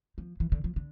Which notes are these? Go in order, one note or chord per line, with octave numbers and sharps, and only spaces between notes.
F3
E3
D3
F3
D3